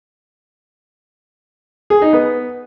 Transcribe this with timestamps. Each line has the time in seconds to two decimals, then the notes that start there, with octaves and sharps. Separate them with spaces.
1.90 G#4
2.02 D#4
2.13 B3